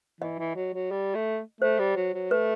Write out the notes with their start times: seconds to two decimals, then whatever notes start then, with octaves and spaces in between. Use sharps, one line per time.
0.21 E3 D#5
0.39 E3
0.56 F#3
0.74 F#3
0.91 G3
1.15 A3
1.61 A3 C5
1.79 G3
1.96 F#3
2.14 F#3
2.31 A3 B4